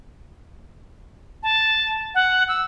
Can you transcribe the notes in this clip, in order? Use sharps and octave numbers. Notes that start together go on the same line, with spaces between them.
A5
F#5
E6